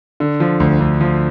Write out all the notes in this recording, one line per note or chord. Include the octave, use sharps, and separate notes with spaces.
D3
F3
D2
D2
F3